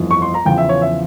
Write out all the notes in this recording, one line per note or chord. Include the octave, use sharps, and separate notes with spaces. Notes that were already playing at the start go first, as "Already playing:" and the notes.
Already playing: G1 F2 E3
C#6
C6
A#5
E2 C#3 F3 G5
E5
C#5
E5